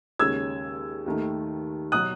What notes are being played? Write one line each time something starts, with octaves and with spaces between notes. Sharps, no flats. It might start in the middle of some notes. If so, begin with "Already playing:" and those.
D#2 C#3 G#3 C#4 E6 G#6
D#2 D#3 A3
B2 F#3 D#6 F#6